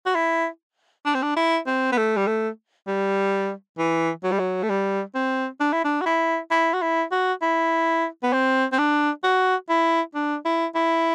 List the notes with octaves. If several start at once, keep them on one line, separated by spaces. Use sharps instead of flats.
F#4
E4
D4
C4
D4
E4
C4
B3
A3
G3
A3
G3
E3
F#3
G3
F#3
A3
G3
C4
D4
E4
D4
F#4
E4
E4
F#4
E4
F#4
E4
B3
C4
C4
D4
F#4
E4
D4
E4
E4